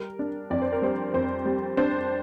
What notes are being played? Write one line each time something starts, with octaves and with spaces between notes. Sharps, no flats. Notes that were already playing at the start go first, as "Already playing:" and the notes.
Already playing: G3 A#4
D4
F2 D5
C5
A#4
G3 C5
F2 C5
G3
D4 C5